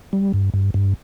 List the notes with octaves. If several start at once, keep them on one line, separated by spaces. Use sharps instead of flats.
G3
G2
G2
G2